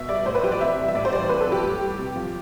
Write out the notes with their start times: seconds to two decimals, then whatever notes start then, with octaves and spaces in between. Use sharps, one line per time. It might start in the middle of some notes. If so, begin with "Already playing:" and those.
Already playing: B2 E5
0.09 G3 D5
0.26 A2 C5
0.35 B4
0.43 F3 G4
0.52 D5
0.60 C3 E5
0.78 E3 G3
0.88 E5
0.95 A2 D5
1.05 C5
1.12 E3 G3 D5
1.29 C3 B4
1.41 A4
1.47 F3
1.52 G4
1.64 A2
1.81 G3
1.98 C3
2.16 F3